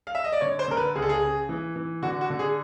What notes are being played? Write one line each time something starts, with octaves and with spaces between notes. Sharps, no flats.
F5
E5
D#5
D5
D3 C#5
C5
D3 A#4
B4
C#2 G#4
A4
G#4
C#3
E3
E3
D3 F#4
F#4
D3
G#4